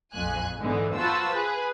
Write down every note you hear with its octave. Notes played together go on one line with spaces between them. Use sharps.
A#1 F2 G#5 F#6
G#2 D3 E3 G#3 B3
F4 F#4 B4 C5 A5 E6
G#4 B4